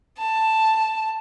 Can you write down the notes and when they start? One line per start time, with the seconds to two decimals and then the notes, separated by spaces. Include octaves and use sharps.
0.18 A5